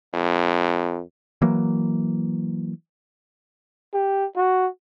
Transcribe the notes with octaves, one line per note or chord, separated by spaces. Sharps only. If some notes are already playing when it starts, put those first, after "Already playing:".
F2
E3 F#3 A#3
G4
F#4